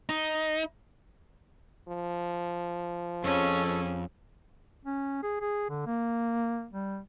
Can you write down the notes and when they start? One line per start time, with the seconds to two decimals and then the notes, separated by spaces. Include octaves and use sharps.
0.09 D#4
1.88 F3
3.24 F2 C#4 G#4 A4 C#5
4.85 C#4
5.23 G#4
5.41 G#4
5.69 D3
5.86 A#3
6.73 G3